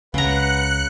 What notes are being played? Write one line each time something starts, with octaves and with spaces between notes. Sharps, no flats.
C#2 C#3 B4 F#5 A#5 F#6 C#7